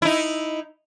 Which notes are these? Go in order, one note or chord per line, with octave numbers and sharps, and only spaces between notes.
D#4 E4